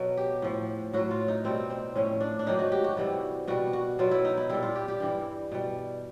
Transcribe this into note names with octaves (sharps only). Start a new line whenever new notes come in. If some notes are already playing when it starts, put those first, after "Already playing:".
Already playing: B2 F#3
G4
A2 F3
A2 F#3 F#4
F4
D#4
B2 G3 C4
C4
A2 F3 C#4
D4
D4
G#2 D#3 F#3 D#4
F#4
G4
F#4
C3 E3 G3
B2 G3 F#4
F#4
B2 F#3 F4
E4
D#4
E4
A#2 G3 E4
F4
G4
G4
G2 E3 G3
B2 G3